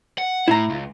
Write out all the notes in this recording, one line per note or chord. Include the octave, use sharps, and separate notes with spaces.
F#5
A2 E4 A#5
C#2